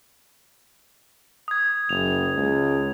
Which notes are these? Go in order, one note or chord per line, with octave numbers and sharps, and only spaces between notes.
D#6 G#6
F#1 F7
C#2